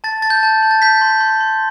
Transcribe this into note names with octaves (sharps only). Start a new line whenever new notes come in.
A5 A6
A5 A6
G6
A5
A5
A6
G6 B6
C6
C6
C6